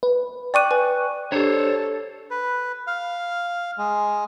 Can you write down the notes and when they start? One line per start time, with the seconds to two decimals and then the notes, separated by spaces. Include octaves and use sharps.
0.03 B4
0.54 D5 G5 C#6 D6 F#6 D#7
0.71 B4 G#5
1.32 D4 G4 A4 C5 C#5
2.30 B4
2.87 F5
3.78 G#3